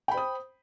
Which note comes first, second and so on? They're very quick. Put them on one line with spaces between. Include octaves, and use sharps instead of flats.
G5 B5 C5 D#6